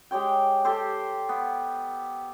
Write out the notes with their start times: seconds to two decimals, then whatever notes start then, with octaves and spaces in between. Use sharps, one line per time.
0.11 G#3 G4 C#5 G5
0.65 G4 A4 C5
1.29 B3